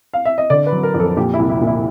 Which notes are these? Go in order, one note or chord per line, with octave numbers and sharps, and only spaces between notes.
F5
E5
D#5
D3 D5
B4
F#3
A#4
F2
A4
A#2 G4
E4
C2
E4
A#2
E4